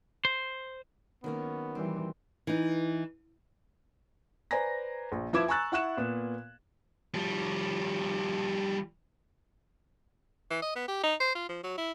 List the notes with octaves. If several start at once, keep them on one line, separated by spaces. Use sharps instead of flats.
C5
D#3 F#3 A#3 B3 C#4
E3 G3 C4
E3 D#4
B4 C5 D5 G#5 A#5 A#6
A#1
F3 E4 B4 D6 G#6 E7
G#5 A#5 C#6 E6 F#6 A6
E4 F#5 C#6 F#6 E7
A#2 B3
F3 G3
E3
D#5
B3
G4
D#4
C5
F4
F3
F#3
E4